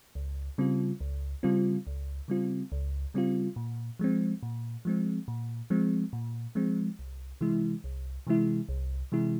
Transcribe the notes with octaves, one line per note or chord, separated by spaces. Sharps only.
C#2
C#3 G3 C4 F4
C#2
C#3 G3 C4 F4
C#2
C#3 G3 C4 F4
C#2
C#3 G3 C4 F4
A#2
F3 G#3 C4
A#2
F3 G#3 C4
A#2
F3 G#3 C4
A#2
F3 G#3 C4
C2
C3 E3 G#3 E4
C2
C3 E3 G#3 E4
C2
C3 E3 G#3 E4